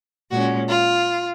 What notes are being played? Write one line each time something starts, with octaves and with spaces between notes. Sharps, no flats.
A#2 G#3 C#4 F#4
F4